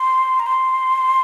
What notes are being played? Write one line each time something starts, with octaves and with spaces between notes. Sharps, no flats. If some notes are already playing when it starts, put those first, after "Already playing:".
Already playing: C6
A#5
C6